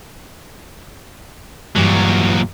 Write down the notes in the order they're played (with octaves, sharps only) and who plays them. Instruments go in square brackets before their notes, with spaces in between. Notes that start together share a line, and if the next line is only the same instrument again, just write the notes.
[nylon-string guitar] G2 E3 [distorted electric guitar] A#2 F#3